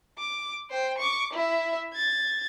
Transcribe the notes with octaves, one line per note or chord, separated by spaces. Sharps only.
D6
C5 G5
C#6 D6
E4 E5
G#6 A6